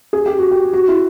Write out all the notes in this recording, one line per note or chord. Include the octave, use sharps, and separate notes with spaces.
G#4
G4
F#4
G4
F#4
E4